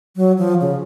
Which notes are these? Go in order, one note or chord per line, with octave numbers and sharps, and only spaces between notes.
F#3
F3
C#3